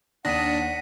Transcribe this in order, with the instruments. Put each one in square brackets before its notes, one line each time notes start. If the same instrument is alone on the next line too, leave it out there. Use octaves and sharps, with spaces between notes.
[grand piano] D#2 D#6 [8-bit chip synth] D4 [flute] F#5 [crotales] A#6 B6 D#7